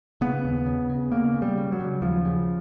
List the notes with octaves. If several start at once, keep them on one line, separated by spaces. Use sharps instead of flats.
C#3 B3
D#2
C#3
C#3
C#3 A#3
C#3
G3
C#3
F#3
C#3
D#2 F3
C#3